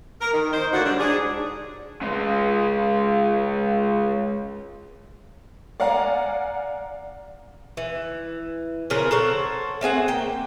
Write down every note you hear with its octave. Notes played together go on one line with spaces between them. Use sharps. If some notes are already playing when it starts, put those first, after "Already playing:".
A#4
D#3
D#3 D#4 C5
A2 D3 A#3 D4 F#4
F#3 G3 D4
G#2 D4 G#4
C#3 G#3
D5 F5 F#5 G#5 A#5
E3
C#3 F3 A#4 B4
A4 C5 C#5 F#5
A3 C4 G#4 F#5
A#3 G5